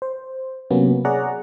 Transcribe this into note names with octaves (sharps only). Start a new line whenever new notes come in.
C5
C3 F#3 A#3 B3 C#4
G#4 C#5 D5 F#5 A#5